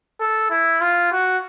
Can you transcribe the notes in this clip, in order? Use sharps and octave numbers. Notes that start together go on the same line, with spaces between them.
A4
E4
F4
F#4